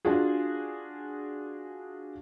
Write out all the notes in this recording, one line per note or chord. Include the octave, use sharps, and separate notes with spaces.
D4 F4 F#4 G#4